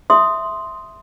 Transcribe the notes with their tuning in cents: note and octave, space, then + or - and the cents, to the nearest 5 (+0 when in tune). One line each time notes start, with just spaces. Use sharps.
E5 +0 C6 +0 D#6 +0